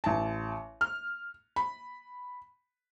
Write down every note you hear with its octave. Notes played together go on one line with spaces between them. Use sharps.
A1 A5
F6
B5